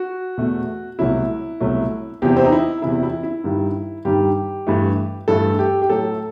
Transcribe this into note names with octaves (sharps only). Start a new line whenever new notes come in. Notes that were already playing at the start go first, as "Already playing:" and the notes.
Already playing: F#4
E2 B2 A3
C2 B2 F#3 A3 E4
C2 B2 F#3 A3
E2 C3 E3 G4
C4
D#4
E4
E2 C3 E3 E4
E4
E4
G2 D#3 G3
G2 D#3 G3 G4
G2 E3 A3
G2 E3 A3 A4
G4
G4
A2 F#3 A3 A4